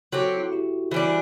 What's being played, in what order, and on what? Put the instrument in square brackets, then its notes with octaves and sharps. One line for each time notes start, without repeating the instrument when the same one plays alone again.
[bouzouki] F#3 C4 G4 [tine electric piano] F#4 A4
[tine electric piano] E4
F#4
E4 G4
[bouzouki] E3 G3 D4 [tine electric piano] C5 E5